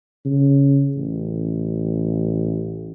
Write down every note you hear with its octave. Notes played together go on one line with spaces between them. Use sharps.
C#3
A1